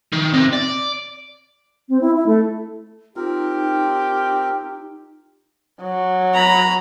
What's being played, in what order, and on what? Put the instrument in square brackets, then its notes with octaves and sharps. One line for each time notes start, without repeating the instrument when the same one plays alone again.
[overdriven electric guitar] D#3
C3
D5
[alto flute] C4
E4
E4
A3
[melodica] C4 A#4 [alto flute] D#4 [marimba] F4 [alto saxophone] G4
[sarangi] F#3
[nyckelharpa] A#5 B5